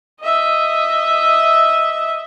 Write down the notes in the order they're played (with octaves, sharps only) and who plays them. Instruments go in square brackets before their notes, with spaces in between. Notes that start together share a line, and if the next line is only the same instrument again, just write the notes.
[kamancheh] D#5 E5